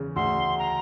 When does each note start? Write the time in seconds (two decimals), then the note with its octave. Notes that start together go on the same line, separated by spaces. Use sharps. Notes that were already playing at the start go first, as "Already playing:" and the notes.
Already playing: E2 C#3
0.16 D2 C6
0.59 A#5